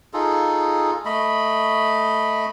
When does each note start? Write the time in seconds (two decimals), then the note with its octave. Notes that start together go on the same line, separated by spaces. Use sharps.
0.13 D#4 F4 G#4 A4
1.05 A3 D#5 B5